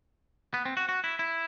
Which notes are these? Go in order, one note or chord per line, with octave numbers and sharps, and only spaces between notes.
B3
C4
F#4
F#4
E4
E4